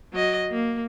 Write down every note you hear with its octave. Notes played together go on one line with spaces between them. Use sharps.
F#3 D#5
A#3